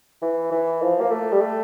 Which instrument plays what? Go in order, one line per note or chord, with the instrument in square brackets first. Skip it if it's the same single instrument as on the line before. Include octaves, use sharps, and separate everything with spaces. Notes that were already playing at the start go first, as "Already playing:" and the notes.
[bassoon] E3
E3
F3
A#3
A3
G3
A3